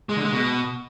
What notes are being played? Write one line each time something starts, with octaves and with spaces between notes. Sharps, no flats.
G#3
D3
G#3
B2